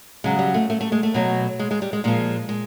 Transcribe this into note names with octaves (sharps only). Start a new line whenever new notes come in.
C#3 F#3 G#3
G3
A3
A3
A3
G#3
A3
B2 F#3
G#3
G#3
G3
G#3
A#2 F3 G#3
G#3